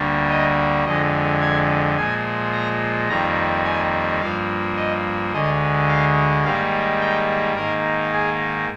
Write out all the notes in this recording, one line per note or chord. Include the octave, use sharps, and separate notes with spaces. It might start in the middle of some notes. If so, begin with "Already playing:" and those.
Already playing: D2 D3 G3 A#3
D#5
F2 D3 G#3 D#5
G#5
A#2 F3 G#3 G#5
A#5
F2 D#3 G3 A#3 A#5
G#5
G2 F3 A#3 F5
D#5
D2 D3 G#3 D#5
F5
G#2 D#3 G3 A#3 F5
G5
G#2 D#3 A#3 A#4
G#4